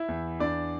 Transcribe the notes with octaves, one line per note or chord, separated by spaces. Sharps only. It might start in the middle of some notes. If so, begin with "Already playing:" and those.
Already playing: E4 E5
E2
E2 D4 D5